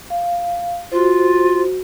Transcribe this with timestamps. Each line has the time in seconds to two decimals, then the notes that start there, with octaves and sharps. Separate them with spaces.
0.10 F5
0.92 F4 F#4 C5